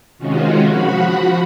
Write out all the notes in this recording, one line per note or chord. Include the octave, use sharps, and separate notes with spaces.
C3 D#3 G#3 C#4 F4 F#4
F3 F#4 F#5 B5